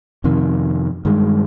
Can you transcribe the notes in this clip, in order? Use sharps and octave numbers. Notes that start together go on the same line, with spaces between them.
F2 C3 D#3
G2 D#3 G#3